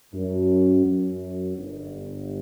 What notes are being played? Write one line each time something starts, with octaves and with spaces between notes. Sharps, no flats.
F#2
F#2
G1 G2